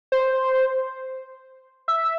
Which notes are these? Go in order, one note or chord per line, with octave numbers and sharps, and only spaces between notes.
C5
E5